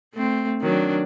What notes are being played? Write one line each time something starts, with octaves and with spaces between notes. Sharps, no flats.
A3 C4
D#3 F#3 D4